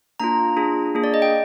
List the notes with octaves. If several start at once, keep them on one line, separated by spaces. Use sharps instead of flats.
A#3 D4 F4 A#5
D4 F4 G#4
A#3 D4 G#4
D5
D#5
G5